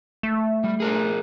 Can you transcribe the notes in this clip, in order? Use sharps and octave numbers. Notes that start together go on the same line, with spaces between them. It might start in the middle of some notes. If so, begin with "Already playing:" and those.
A3
G3
G#4 A#4 D5